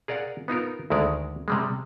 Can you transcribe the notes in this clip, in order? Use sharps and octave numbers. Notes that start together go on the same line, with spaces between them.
G#4 A#4 D5 F5 F#5
B3 D#4 F4 A#4
D2 D3 D#3 G#3 A#4 D5
C3 G3 G#3